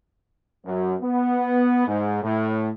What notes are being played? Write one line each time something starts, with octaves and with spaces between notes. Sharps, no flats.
F#2
B3
G#2
A2